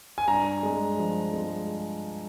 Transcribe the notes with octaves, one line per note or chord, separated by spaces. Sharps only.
G#5
G2 A#5
G#3
F3
G#3